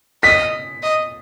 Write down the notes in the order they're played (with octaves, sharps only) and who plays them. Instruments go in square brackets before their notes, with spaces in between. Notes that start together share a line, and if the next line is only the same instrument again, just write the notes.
[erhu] D#5 [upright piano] B6
[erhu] D#5